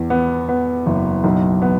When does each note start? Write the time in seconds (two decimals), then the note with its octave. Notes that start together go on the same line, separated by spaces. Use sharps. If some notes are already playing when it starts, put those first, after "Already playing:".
Already playing: E2
0.10 B3
0.49 B3
0.86 F#1
1.24 B1
1.62 B3